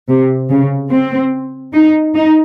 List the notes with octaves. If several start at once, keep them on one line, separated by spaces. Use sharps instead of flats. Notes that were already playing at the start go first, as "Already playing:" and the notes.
C3
C#3
C4
D#4
D#4